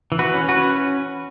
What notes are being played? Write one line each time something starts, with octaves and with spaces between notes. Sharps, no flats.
E3
F#4 B4
C#4
F#4 B4
C#4